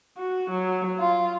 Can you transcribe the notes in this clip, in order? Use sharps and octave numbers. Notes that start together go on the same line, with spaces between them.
F#4
F#3
F4